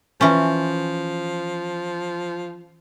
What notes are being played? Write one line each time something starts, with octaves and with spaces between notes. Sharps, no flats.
E3 F3 C#4